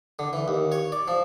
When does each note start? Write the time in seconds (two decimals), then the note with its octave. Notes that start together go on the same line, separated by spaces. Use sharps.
0.19 D3
0.33 E3
0.48 D#2
0.72 C#5
0.92 D5
1.08 F3